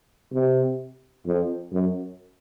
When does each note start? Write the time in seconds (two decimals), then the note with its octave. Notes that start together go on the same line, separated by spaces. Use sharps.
0.34 C3
1.27 F2
1.73 F#2